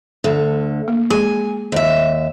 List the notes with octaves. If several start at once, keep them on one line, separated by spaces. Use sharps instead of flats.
D2 D3
A#3
G#3 G#4 G#5
D#2 E5